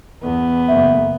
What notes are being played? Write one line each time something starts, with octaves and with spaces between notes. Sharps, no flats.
E2 B3
F#1 E5